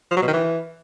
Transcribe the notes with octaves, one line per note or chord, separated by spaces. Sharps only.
F3
F#3
B2
D#3
E3